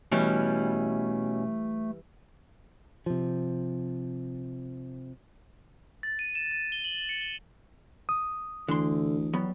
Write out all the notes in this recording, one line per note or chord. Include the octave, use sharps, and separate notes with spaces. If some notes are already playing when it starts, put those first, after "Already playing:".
B2 E3 G3 A3 C#4
C3 F3
A6
D#7
E7
D#7
G7
F#7
C#7
G7
D#6
D2 D3 E3 C6
F#3 G3 B3